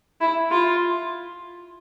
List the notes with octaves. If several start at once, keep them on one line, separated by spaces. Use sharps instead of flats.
E4
F4